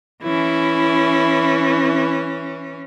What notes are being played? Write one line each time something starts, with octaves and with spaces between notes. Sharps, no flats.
E3 C#4 E4